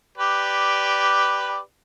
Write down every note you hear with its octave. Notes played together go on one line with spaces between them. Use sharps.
G4 B4 D5